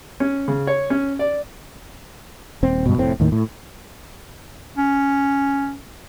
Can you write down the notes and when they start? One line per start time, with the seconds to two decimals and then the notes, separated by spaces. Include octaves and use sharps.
0.20 C#4
0.48 C#3
0.67 C#5
0.90 C#4
1.19 D5
2.63 D#1 C4
2.86 G2 B2
2.98 F1 A2 C4
3.20 D#2 A2 D#3
3.32 A2
4.77 C#4